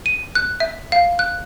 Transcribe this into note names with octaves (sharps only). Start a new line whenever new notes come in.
D#7
F#6
E5
F5
F#6